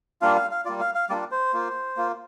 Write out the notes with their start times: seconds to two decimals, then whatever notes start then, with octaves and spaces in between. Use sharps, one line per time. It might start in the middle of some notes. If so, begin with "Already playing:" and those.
0.22 G3 A#3 D4 F4 F5
0.36 F5
0.51 F5
0.65 G3 A#3 F4 D5
0.80 F5
0.95 F5
1.09 G3 A#3 D4 F4 D5
1.31 C5
1.53 A#3 F4
1.97 A#3 F4